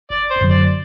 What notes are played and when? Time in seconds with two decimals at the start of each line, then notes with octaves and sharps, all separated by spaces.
0.10 G1 D5
0.31 C5
0.41 F#2 D3 F#3
0.50 D5